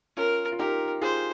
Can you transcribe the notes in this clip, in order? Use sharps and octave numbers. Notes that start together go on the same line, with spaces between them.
C#4 F4 A#4
F4
D#4 G4 A#4
F4 G#4 C5